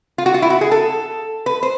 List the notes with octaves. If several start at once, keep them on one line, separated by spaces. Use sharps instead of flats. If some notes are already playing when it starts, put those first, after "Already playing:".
F4
F#4
F4
E4
F#4
G#4
A4
B4
C5